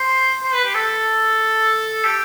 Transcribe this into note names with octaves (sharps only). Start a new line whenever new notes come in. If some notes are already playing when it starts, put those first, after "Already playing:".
Already playing: C5
C5
B4
G4
A4
G4